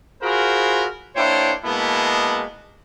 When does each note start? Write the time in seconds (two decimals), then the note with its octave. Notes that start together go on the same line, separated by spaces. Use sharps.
0.22 F4 F#4 G#4 A#4 C5 B5
1.15 A#3 D4 E4 C5 C#5 G5
1.64 B2 G#3 A#3 B3 E4 A5